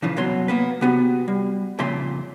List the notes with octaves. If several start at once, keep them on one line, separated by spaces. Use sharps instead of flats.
A#2 C#3 E3 F3
C2 F#2 B2 F#3 C6
A#3 B3 B4
C3 B3 F#4
G3
F2 A#2 C#3 E5 C6